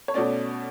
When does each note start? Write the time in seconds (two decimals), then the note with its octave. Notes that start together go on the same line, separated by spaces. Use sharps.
0.08 C#5
0.14 B2 A3 C#4 D5